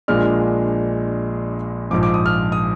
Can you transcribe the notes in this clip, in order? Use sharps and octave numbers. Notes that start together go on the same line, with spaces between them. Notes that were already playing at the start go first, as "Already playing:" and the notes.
A#1 A#2 G#3 D4 F6
A#1 G#2 F3 D6
D6
D#6
F6
D#6